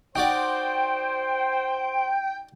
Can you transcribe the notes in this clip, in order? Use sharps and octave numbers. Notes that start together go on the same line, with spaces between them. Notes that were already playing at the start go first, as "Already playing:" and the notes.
D#4 F#4 C5 D5 G5